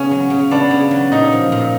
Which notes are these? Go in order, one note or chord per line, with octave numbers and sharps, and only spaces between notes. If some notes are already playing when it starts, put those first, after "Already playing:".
Already playing: C#3 B3 C#4
F#3
C#3
B3 D4
C#3
F#3
A#2 D#4
F3
A#2